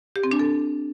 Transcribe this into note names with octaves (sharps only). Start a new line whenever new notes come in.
G4
C4
D4
A4